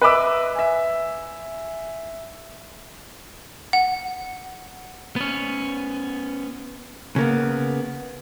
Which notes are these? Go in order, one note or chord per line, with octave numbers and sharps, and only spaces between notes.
B4 D#5 E5 B5 D6 E6
E5 G#5
F#5
B3 C#4
C#3 A#3 B3